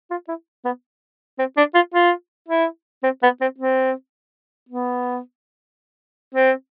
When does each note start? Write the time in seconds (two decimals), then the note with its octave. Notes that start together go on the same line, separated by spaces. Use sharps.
0.11 F4
0.28 E4
0.65 B3
1.39 C4
1.57 D4
1.75 F4
1.94 F4
2.49 E4
3.03 C4
3.23 B3
3.41 C4
3.59 C4
4.69 B3
6.35 C4